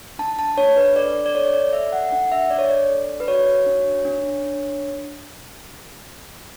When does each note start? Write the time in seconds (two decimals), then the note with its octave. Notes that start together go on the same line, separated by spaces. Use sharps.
0.19 D4 A5
0.39 A5
0.57 D4 C#5
0.77 B4
0.96 A4 D5
1.26 D5
1.35 A4 C#5
1.54 D5
1.73 A4 E5
1.92 F#5
2.12 D4 F#5
2.32 E5
2.50 D4 D5
2.59 C#5
2.67 D5
2.89 A4
3.20 B4
3.28 F#4 C#5
3.66 D4
4.05 D4